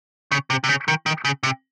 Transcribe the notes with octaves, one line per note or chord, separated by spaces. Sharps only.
C#3
C3
C3
C#3
D#3
D#3
C#3
C3